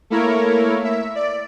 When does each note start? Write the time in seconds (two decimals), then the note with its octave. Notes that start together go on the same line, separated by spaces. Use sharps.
0.10 A3 A#3 E4 A#4 C#5
0.83 E5
1.15 D5